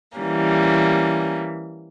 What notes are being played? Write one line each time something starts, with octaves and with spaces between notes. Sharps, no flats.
E3 G3 A#3 C#4